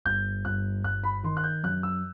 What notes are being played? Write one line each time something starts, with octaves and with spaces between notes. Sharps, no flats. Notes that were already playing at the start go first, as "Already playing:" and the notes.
G1 G6
G1 F#6
G1 F#6
B5
D#3 C6
F#6
G6
F#2 F#6
E6